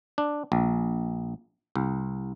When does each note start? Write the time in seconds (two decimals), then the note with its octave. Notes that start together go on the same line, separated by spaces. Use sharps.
0.18 D4
0.52 A#1
1.76 C2